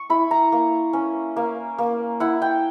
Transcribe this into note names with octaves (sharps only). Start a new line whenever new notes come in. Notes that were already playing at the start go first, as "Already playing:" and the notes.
Already playing: C#6
E4 B5
A#5
A#3
C#4
A#3
A#3
E4 F#5
G5